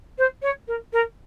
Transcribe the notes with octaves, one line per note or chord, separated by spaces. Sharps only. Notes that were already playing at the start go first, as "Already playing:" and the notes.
C5
C#5
A#4
A#4